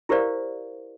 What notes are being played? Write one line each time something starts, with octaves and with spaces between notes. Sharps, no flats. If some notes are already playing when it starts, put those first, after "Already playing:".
E4 G4 A#4 C5 D5 F5